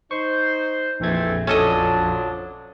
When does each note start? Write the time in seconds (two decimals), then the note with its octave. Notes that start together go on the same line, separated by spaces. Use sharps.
0.11 D#4 C5 C#6
1.00 A#1 F2 E3 A3 C4 G#6
1.47 F3 F#3 C#4 D4 A4 D#5